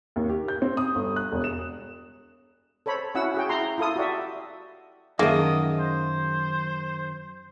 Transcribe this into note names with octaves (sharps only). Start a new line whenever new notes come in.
D#2
G4
G6
C4
D#6
G1
F#6
E1
E7
A4 C5 C#5 B5
C#4 E4 F#4 F#5 E6
F#4 G#4 G5
E4 A#5 C6
E4 F4 A4 D#6
F#4 G4 D5 E5
F#2 D#3 A#3 D#4 G#4 D#5 E5
C5